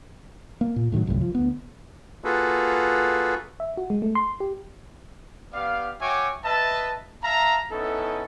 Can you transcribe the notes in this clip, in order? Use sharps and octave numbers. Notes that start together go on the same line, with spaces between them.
A#3
A#2
A2 D#3 E3 F#3
G1 C2 F#2 A2
F3
D2 B3
A#3 F4 F#4 G#4 A4 B4
E5
F#4
G#3
A3
C6
G4
B3 G4 D5 F5
F#4 C#5 E5 G5 G#5 D6
B4 D#5 E5 A5
E5 F5 A5 A#5
B3 C#4 D#4 E4 A4